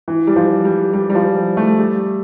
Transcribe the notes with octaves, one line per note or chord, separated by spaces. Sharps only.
E3
G3
F3
G3
G3
G3
F3
G3
A3
G3